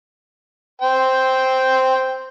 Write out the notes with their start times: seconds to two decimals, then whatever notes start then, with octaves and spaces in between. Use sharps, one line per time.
0.82 C5 G5